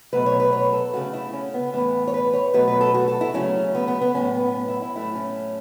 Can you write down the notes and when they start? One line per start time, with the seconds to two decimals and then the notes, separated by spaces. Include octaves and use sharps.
0.13 B2 F#3 A3 B4
0.26 C#5
0.40 B4
0.53 C#5
0.73 A4
0.93 C#3 A3 F#4
1.13 E4
1.33 C#4
1.54 B3
1.74 A2 E3 A3 B3
2.07 C#5
2.14 B4
2.33 C#5
2.54 B2 F#3 A3 B4
2.68 B4
2.81 A4
2.94 F#4
3.08 A4
3.21 E4
3.34 C#3 F#3 A3 C#4
3.75 B3
3.88 B3
4.02 B3
4.14 A2 F#3 B3 C#4
4.34 B3
4.55 C#4
4.68 E4
4.82 E4
4.95 A2 F#3 A3 E4
5.15 C#4